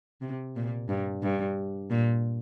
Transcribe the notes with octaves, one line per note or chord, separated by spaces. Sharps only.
C3
A#2
G2
G2
A#2